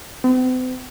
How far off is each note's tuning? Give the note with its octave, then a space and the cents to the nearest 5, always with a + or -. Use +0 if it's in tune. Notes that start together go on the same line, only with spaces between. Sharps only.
C4 -45